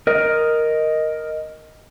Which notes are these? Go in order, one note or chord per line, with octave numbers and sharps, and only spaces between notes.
A#4 D#5